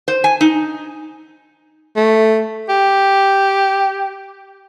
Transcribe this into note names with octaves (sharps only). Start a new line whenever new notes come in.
C5
G#5
D#4
A3
G4